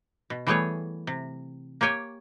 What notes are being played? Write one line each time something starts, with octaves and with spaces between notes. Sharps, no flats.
B2
E3 G3 A3 B3 G#4 C#5
C3
A#3 G4 C#5 G5 G#5